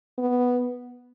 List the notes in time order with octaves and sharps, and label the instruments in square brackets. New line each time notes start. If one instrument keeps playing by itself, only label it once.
[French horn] B3